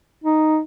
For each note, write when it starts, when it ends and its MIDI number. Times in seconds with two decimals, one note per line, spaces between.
0.24 0.60 63